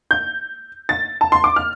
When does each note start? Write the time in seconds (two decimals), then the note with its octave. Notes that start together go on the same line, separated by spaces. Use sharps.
0.11 G6
0.89 A6
1.21 A5
1.32 C6
1.44 D6
1.56 F6